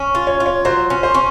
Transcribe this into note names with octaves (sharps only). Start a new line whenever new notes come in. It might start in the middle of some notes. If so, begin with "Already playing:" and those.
Already playing: C#4
F4
C#5
F4
C#5
F#3 C5
C#4
C5
C#4